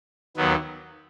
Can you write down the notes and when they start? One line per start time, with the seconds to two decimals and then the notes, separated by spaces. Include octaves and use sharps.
0.36 D#2 D#3 F#3 B3